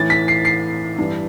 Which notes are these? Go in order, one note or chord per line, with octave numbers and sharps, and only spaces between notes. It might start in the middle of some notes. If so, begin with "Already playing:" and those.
Already playing: A2 E3 A6
B6
C7
C7
G2 E3